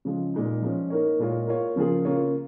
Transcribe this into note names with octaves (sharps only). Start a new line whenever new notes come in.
C#3 F3 G#3 F4
A#2 G#3 D#4
F3 G#3 C#4
A#3 D#4 A#4 C#5
A#2 G#3 F4 A#4 C#5
A#3 F4 C#5
C#3 F3 A#3 F4 G#4
C#3 A#3 F4 C#5